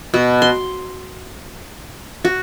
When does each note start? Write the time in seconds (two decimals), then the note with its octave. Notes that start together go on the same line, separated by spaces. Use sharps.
0.14 B2
0.42 C6
2.25 F#4